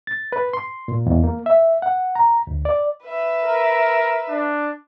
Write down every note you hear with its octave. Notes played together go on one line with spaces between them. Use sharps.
A6
B4
C6
A#2
E2
A#3
E5
F#5
A#5
D2
D5
B4 E5
A#4
D4